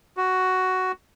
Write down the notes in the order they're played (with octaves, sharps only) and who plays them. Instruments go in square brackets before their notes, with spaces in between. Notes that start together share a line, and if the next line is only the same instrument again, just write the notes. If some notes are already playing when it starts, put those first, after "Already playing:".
[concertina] F#4